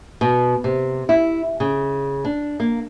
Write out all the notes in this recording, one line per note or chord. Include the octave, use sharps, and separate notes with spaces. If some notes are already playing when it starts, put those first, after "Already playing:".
B2
C3
E4
C#3
D4
A#3